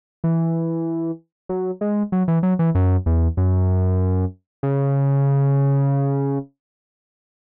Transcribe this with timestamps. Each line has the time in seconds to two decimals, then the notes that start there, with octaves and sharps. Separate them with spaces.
0.24 E3
1.49 F#3
1.81 G#3
2.12 F#3
2.28 E3
2.43 F#3
2.59 E3
2.75 F#2
3.06 E2
3.37 F#2
4.63 C#3